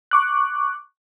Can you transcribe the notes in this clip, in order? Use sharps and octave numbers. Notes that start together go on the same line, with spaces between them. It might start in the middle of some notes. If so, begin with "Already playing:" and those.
C#6 D6 F#6